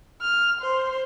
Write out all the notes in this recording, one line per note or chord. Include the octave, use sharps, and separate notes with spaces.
F6
C5